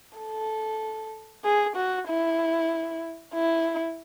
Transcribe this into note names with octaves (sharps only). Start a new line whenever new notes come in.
A4
G#4
F#4
E4
E4